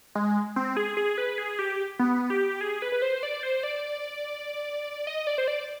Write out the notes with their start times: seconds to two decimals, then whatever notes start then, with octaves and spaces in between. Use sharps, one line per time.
0.15 G#3
0.56 C4
0.77 G#4
0.97 G#4
1.18 B4
1.38 G#4
1.59 G4
1.99 B3
2.30 G4
2.61 G#4
2.82 B4
2.92 B4
3.02 C5
3.23 D5
3.43 C5
3.63 D5
5.07 D#5
5.27 D5
5.38 C5
5.48 D5